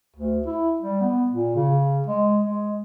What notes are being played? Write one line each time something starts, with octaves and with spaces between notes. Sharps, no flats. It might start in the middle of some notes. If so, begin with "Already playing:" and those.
D2
E4
G3
B3
A#2
C#3
G#3
G#3